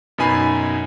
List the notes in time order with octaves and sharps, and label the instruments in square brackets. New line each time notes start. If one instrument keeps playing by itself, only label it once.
[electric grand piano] F#2 B2 D#4 G#5 B5 C7